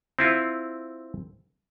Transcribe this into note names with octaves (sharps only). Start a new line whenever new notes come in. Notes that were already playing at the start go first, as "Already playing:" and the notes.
C4 E4 F4